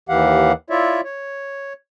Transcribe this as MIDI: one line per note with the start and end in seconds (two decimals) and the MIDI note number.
0.09 0.52 39
0.09 0.52 52
0.09 0.52 67
0.09 0.52 77
0.09 0.52 78
0.70 1.01 64
0.70 1.01 65
0.70 1.01 73
0.70 1.01 74
0.70 1.01 76
1.04 1.73 73